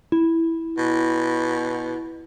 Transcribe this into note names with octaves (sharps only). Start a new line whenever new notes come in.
E4
B2